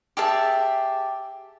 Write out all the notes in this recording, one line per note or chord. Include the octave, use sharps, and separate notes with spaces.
G4 G#4 E5 A5